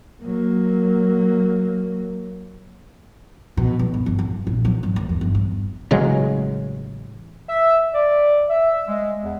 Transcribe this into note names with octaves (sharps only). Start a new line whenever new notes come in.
F#3 A#3
B2
B1
F#2
G1
F2
A#1
F#3
G#1
D#2
E2
G1
G2
A1 C#3 F#3 G#3
E5
D5
E5
G#3
E2